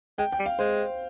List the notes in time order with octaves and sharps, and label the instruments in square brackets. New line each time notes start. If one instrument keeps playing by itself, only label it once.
[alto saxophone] G#3 [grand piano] G5
[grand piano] G5
[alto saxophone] G3
[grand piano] F5
[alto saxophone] G#3 [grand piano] C5